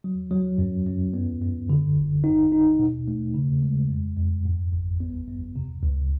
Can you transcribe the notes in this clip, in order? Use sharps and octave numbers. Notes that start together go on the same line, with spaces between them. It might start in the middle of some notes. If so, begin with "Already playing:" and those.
F#3
F#3
F#2
F#2
B3
F#2
D3
G1
D#4
D#4
B2
A3
C#3
G#3
F2
F2
G#2
G#1
B3
F#2
C3
C#2